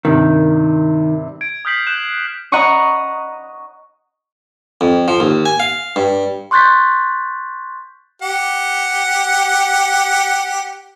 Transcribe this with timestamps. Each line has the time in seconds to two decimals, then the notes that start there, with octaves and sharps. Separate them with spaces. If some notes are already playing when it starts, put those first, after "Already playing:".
0.05 G2 C3 D#3
1.41 G#6 D7
1.65 D#6 F6 G6 B6 C7 F#7
1.87 F#6 G6 E7
2.52 D#5 F#5 A#5 B5 C#6 D#6
4.81 F2
5.08 F3
5.20 D#2
5.46 G#5
5.60 F5
5.96 G2
6.51 C6 C#6 F#6 G6 A6 B6
8.22 G4 F#5